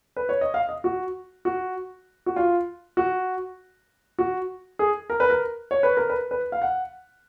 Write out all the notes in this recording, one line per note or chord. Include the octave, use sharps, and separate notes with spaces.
B4
C#5
D#5
F5
D#5
F#4
F#4
F#4
F4
F#4
F#4
G#4
A#4
B4
A#4
C#5
B4
A#4
B4
B4
F5
F#5